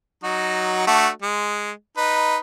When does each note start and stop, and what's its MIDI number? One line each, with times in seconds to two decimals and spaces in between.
0.23 0.85 54
0.23 0.85 63
0.23 0.85 66
0.87 1.08 57
0.87 1.08 62
0.87 1.08 66
1.22 1.71 56
1.97 2.37 63
1.97 2.37 71